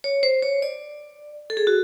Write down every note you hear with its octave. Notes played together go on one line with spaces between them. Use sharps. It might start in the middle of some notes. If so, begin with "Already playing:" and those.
C#5
C5
C#5
D5
A4
G#4
F#4